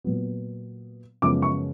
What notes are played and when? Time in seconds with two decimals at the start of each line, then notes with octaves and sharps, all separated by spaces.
0.04 A#2 F#3 B3
1.22 F#2 C#3 F3 G#3 B3 D6
1.42 C#6